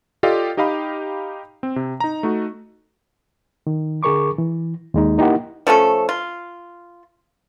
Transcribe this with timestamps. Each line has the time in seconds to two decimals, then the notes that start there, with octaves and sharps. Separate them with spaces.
0.23 F4 G4 A4 D5 D#5 F5
0.57 D#4 G4 D#5 F5 B5
1.63 C4
1.76 C3
2.00 D#4 A#5
2.23 A3 D#4 F#4
3.67 D#3
4.03 D3 G#4 A#4 C#6 D6
4.38 E3
4.94 D#2 G#3 D#4
5.18 A#3 D#4 E4 G4 A#4 F#5
5.67 F3 A3 C#4 A4
6.09 F4